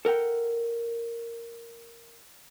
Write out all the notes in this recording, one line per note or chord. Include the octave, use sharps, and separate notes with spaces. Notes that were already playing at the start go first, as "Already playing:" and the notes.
A4 A#4 F#5 G5